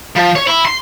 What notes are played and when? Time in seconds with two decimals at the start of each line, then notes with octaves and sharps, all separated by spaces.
0.16 F3
0.36 C#5
0.47 E4
0.65 C6